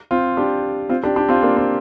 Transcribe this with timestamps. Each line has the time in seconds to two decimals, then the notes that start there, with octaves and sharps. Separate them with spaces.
0.11 C4 F4
0.37 D4 G4
0.89 C4 F4
1.03 D4 G4
1.16 D4 G4
1.29 C4 F4
1.43 A#3 D4
1.57 C4